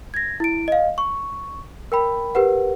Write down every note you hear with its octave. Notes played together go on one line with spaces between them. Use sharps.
G#6 A#6
E4 D7
D#5 F5
C#6
A#4 G5 B5
G4 A#4 B4 F#5